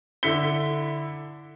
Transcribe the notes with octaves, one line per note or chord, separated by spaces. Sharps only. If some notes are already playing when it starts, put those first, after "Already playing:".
D3 E4 B6 C#7 G7